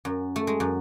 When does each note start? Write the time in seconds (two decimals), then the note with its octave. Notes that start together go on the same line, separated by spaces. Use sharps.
0.05 F#2
0.36 A3
0.47 G#3
0.60 F#2